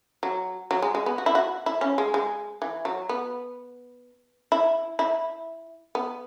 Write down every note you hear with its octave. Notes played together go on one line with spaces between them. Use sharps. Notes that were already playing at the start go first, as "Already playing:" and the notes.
F#3
F#3
G#3
G#3
B3
F#4
E4
F#4
E4
C#4
G#3
G#3
E3
F#3
B3
E4
E4
B3